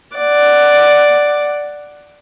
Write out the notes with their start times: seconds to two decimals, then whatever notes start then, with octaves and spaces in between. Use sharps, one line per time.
0.16 D5 F#5